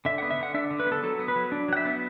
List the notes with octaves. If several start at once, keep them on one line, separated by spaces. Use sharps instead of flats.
D3 E5
F#5
B3
E5
D3 F#5
D4 E5
D3
B4
B3
A4
F#3 A4
B3
B4
F#3
D4
F#3 F#5
E5
B3